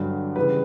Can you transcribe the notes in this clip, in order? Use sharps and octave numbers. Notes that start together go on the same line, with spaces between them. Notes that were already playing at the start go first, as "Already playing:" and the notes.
Already playing: G2 D3 F#3
C#3 E3 G3 B4